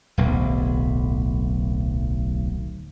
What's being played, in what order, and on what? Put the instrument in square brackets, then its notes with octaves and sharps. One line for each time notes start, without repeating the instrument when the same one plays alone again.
[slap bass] D1 B1